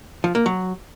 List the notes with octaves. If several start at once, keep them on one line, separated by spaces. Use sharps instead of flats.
F3
A#3
F#3